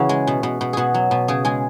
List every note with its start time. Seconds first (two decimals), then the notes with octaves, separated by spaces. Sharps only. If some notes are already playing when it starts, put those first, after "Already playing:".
Already playing: C#3 E3 F#4 C#5
0.09 G#3
0.27 B2
0.43 B2
0.61 B2
0.73 B2 F#4 G#4
0.94 F#3
1.11 B2
1.28 C#3 G#4
1.45 G#3 G#4